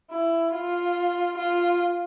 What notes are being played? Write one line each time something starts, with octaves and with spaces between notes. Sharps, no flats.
E4
F4
F4